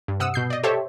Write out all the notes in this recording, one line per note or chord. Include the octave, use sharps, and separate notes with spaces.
G2
C3 F#5 D#6 E6
B2 G6 C7
D5 D#5
G4 A4 C5 C#5 E5